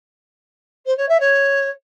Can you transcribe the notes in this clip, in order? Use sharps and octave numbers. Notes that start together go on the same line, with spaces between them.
C5
C#5
E5
C#5